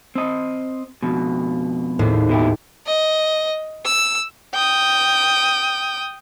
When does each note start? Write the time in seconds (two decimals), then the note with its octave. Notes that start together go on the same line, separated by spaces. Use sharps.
0.15 C4 D#5
1.03 F2 B2
1.99 G#1 D#2 A2
2.29 B2 E4 G4
2.87 D#5
3.85 E6
4.54 G5 D#6